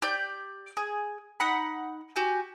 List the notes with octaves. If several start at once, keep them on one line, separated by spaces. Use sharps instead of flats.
G4 D5 G6
G#4
D#4 F#5 B5
F#4 G4 G#5